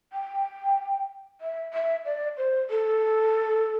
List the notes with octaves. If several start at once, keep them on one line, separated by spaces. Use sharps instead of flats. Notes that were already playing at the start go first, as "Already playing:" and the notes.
G5
E5
E5
D5
C5
A4